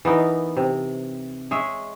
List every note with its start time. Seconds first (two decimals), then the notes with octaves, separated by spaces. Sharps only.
0.05 E3 B3 D#4 A#4
0.57 C3
1.51 G#3 G#4 C#5 E5